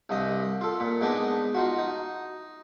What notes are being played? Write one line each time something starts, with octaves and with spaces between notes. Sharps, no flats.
C2 G2 D#5
F4 A4
A#2
G#3 B3 D4 D#4
D#4 F4 F#4
D#4